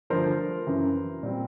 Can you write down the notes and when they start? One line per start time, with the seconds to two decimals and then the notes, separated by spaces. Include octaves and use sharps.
0.10 G2 D3 F3 A3 A#4 C5
0.66 F#2 C#3 E3
1.23 A#2 G3 C4